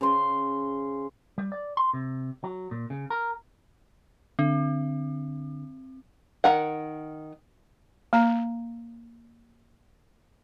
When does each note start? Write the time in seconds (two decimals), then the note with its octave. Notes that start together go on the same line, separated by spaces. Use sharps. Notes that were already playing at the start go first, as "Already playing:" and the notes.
0.01 C#3 C5 C6
1.38 G3
1.52 D5
1.77 C6
1.94 C3
2.44 F#3
2.71 A#2
2.90 C#3
3.10 A#4
4.39 D3 C4
6.44 D#3 A#4 F#5
8.13 A#3 A#5